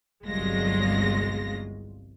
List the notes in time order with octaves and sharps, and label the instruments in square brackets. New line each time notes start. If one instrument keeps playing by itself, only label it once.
[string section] G1 C2 F#3 G#3 F4 A#6